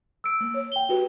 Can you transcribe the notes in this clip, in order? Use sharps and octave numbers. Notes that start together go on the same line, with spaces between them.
E6 D7
A#3
C#5
G5 G7
F#4 G4 B4